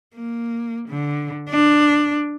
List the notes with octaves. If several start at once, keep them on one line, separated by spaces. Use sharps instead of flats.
A#3
D3
D4